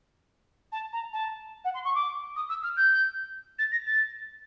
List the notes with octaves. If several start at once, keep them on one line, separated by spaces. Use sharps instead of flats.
A5
A#5
A5
F#5
C6
C#6
D6
D#6
E6
F6
G6
A6
A#6
A6